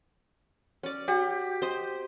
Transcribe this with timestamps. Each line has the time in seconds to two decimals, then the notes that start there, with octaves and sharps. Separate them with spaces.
0.83 C#4 D5
1.08 F#4 G4
1.62 C5 D#5